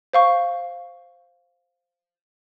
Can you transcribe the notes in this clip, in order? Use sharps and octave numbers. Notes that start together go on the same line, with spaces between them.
C5 F5 C#6